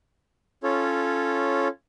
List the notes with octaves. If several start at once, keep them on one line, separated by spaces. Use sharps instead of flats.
C#4 F4 A4 C#5